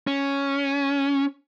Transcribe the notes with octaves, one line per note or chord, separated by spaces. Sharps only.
C#4